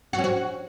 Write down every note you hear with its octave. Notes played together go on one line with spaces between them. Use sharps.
F#4
C#4
F#4